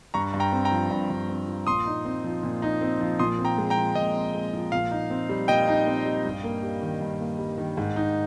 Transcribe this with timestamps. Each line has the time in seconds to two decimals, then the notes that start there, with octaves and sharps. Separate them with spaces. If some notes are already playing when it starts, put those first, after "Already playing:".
0.14 G2 A#5 C#6
0.34 G2
0.40 G5 A#5
0.53 C4
0.65 G5 A#5
0.72 F3
0.91 G2
1.10 G2
1.29 C4
1.48 F3
1.67 A#2 C6 D#6
1.86 D#4
2.05 C4
2.24 F3
2.43 A#2
2.62 D#4
2.81 C4
3.00 F3
3.19 A#2 C6 D#6
3.39 C4
3.45 G5 A#5
3.58 G#3
3.70 G5 A#5
3.77 F3
3.95 A#2 D#5
4.15 C4
4.34 G#3
4.53 F3
4.72 A#2 F5
4.91 D#4
5.10 C4
5.29 G3
5.48 A#2 D#5 G5
5.68 D#4
5.86 C4
6.06 G3
6.25 G2
6.44 A#3
6.63 G3
6.82 D#3
7.01 G2
7.20 A#3
7.39 G3
7.58 D#3
7.77 G#2
7.96 D#4